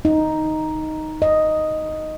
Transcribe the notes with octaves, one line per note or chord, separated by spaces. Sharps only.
D#4
D#5